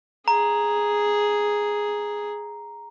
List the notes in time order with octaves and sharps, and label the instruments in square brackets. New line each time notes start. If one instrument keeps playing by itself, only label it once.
[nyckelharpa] G#4 [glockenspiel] A#5